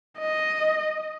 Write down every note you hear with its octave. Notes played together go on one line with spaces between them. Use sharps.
D#5